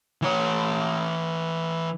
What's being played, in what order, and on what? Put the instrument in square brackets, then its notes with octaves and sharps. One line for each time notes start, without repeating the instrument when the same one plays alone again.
[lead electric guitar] E3 C#5